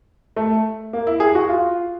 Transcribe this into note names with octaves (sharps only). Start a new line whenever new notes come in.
A3
A#3
E4
G#4
F#4
F4